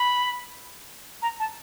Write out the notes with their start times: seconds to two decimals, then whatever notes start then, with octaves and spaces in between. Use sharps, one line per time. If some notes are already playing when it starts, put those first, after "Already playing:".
Already playing: B5
1.22 A#5
1.40 A5